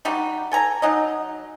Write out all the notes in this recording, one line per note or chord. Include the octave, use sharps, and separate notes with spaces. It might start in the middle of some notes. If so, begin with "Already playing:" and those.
G3 D#4 F#4 G4
A4 G#5 A#5
F#3 D#4 D#5